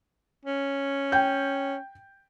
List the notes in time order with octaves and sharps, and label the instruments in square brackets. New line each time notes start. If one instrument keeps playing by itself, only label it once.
[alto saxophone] C#4
[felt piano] G5 G6